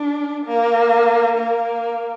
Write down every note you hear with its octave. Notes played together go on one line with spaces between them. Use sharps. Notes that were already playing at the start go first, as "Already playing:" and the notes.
Already playing: D4
A#3
A#3